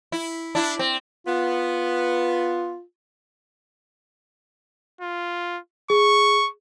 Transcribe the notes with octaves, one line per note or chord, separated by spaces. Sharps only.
E4
D4 E4
C4
B3 F4
F4
G#4 C#6